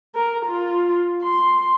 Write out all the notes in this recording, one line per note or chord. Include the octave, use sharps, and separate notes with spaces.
A#4
F4
C6